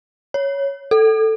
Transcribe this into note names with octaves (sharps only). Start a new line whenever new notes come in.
C#5
A4